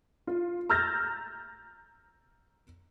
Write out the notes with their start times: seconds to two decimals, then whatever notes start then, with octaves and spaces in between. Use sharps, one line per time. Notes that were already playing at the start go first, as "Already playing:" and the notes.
0.27 F4
0.70 A#5 E6 F6 G6 A6 A#6